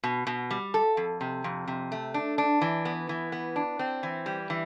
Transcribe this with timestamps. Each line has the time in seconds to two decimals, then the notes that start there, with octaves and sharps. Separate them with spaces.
0.03 B2
0.27 B2
0.51 G3
0.74 A4
0.97 F2
1.21 C3
1.44 F2
1.68 C3
1.92 A3
2.14 D4
2.38 D4
2.61 E3
2.85 B3
3.09 E3
3.32 B3
3.56 D4
3.79 C4
4.03 E3
4.26 G3
4.50 E3